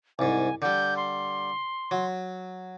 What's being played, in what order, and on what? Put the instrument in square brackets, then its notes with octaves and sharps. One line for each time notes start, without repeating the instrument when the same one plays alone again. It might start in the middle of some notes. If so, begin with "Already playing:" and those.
[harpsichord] C2 G#2 [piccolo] G#5
[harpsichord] D3 G3 [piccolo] G6
[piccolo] C6
[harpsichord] F#3